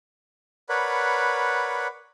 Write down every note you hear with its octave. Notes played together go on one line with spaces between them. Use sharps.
A#4 B4 C#5 D5 F#5 B5